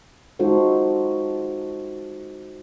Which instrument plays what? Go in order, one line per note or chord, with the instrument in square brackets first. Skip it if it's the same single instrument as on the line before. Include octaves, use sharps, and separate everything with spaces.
[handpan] G#3 D#4 F4 F#4 A4 C5